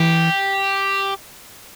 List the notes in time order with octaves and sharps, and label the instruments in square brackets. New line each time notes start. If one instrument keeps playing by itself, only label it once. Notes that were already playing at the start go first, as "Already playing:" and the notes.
Already playing: [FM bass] E3 [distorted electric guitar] G4